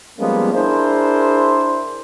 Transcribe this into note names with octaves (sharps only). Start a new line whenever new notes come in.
F3 G3 G#3 A#3 B3 C#4
D4 E4 G#4 A#4 C5